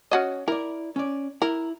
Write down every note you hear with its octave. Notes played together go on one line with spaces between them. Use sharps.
C#4 F#4 D#5
E4 A#4 D5
C#4 D5
E4 A#4